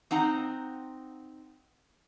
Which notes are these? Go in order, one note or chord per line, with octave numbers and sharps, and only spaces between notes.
C4 D#4 F#5 A#5